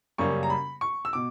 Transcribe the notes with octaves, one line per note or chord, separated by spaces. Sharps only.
F#2 C#3 G3 A#3 C#4 C#6
A#5
B5
C#6
E6
B2 D6